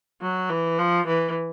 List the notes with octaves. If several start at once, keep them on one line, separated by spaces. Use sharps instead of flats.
F#3
E3
F3
E3